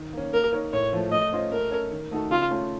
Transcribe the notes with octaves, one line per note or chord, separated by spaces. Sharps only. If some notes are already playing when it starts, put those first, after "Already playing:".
Already playing: D#3
A#3 C#4
A#3 A#4
D#4 A#4 C#5
A2 C#5
F3 A3
A3 D#5
C#4 F4 C5 D#5
A3 A#4
C#4 A4 C#5
D#3
A3 D#4 F#4 A4
C#3 F4
A3 C#4 F4